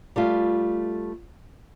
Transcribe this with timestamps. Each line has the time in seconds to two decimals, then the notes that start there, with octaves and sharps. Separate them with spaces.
0.16 G3 A3 F4